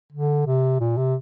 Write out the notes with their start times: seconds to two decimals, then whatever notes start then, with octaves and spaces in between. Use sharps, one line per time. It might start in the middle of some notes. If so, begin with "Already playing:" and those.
0.13 D3
0.47 C3
0.80 A#2
0.98 C3